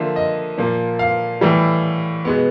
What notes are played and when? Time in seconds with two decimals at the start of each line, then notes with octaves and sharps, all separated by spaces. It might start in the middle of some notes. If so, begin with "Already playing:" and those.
Already playing: D3 F3 A#3 E5
0.16 D#5
0.58 A#2 F3 A#3
0.99 F5
1.41 A2 E3 G3
2.25 B2 G#3 B3